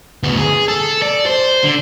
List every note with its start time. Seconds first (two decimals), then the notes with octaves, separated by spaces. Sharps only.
0.23 D2 B3
0.38 G#4
0.68 A4
1.02 D5
1.26 C5
1.64 D3